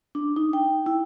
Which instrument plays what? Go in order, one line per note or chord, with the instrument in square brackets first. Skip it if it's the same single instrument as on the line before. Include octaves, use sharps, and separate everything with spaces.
[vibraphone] D4
D#4
G5
E4